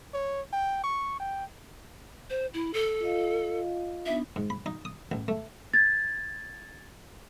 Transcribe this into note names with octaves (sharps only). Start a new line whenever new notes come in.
C#5
G5
C#6
G5
C5
E4
A4
F4 D#5 F5
B3 D4 D#4 E5
G#2
B5
D#4
D#6
A1
A3
G#6 A6